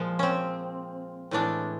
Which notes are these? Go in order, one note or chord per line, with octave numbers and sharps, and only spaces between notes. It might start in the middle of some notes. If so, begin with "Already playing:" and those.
Already playing: A#2 F3 G#3
C4 C#4
A2 E3 G#3 D4